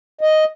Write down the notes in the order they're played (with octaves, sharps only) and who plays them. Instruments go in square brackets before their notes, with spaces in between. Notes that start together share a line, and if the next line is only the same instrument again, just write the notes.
[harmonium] D#5